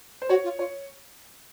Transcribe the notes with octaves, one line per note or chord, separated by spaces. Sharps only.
C5
F#4 C#5
F4
F4 C#5